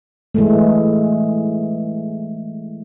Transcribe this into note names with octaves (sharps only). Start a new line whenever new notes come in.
E3 G#3 A3